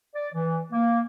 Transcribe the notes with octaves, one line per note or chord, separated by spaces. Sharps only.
D5
E3
A#3